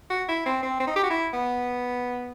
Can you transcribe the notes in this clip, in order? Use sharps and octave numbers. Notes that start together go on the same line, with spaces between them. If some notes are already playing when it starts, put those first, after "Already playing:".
F#4
E4
C4
C4
C4
D#4
G4
F#4
E4
B3